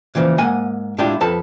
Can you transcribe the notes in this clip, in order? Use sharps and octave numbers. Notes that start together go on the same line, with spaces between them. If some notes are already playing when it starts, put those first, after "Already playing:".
A#2 C#3 E3 F3
G#2 A#3 F#5 G#5
A2 G#3 D4 E4 F4 G4
F2 A4 B4 A5